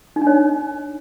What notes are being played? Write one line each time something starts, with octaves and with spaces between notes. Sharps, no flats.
D#4
D4
C#5